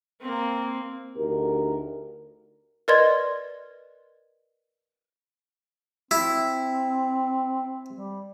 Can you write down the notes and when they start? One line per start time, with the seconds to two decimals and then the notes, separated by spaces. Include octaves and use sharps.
0.21 A#3 C4
1.17 D2 D#4 F#4 G4 A#4
2.88 A#4 B4 D5 D#5 C6 G#6
6.11 C4 E4
7.95 G3